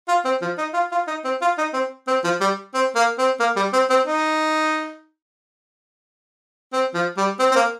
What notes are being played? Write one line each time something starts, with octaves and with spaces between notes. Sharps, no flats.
F4
C4
F3
D#4
F4
F4
D#4
C4
F4
D#4
C4
C4
F3
G3
C4
A#3
C4
A#3
G3
C4
C4
D#4
C4
F3
G3
C4
C4
A#3